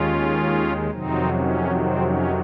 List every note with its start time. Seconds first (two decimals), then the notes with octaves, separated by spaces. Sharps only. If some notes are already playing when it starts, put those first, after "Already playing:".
Already playing: D#2 D#3 G#3 C#4 F4
0.90 F2 C3 D#3 F#3 C4 D#4
1.34 C#4
1.77 C4
2.06 C#4